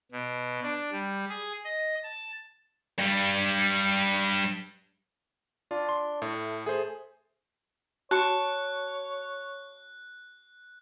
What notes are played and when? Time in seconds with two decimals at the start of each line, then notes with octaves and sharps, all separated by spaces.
0.12 B2
0.63 D4
0.92 G3
1.29 G#4
1.65 D#5
2.03 A5
2.99 G2 G3
5.71 D4 F4
5.89 C6
6.22 A2 A3
6.66 A3 G#4 C5
8.11 F#4 C#5 A5 C#6 F#6